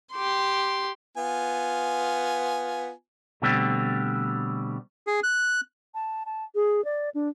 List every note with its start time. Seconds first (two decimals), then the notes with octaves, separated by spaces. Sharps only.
0.12 G4 C6
1.17 B3 F4 G#5
3.42 B2 D3 G3 A3 C4
5.07 G#4
5.23 F#6
5.95 A5
6.26 A5
6.55 G#4
6.85 D5
7.15 D4